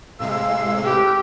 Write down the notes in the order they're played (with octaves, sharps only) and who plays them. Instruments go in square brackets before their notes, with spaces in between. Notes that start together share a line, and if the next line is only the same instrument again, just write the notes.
[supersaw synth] A2 C3 G#3 [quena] F5 [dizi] E6
[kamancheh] G4 [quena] B4